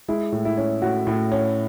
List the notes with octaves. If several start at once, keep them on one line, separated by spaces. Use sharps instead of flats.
G#3 E4
A2
E4
C#4
A2 F#4
A2
C#4